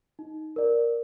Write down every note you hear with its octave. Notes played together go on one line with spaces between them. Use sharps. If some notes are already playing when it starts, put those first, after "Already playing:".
D#4
A#4 D5